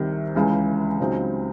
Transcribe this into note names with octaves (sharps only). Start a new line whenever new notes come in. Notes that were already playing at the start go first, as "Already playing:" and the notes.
Already playing: C2 C3 D#3
C#2 C#3 E3 G#3
C#2 C#3 F#3 C4 D#4